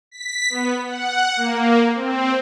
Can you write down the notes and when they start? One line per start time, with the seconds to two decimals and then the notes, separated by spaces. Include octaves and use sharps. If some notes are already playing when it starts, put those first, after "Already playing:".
0.11 B6
0.50 B3
0.86 F#5
1.37 A#3
1.94 C4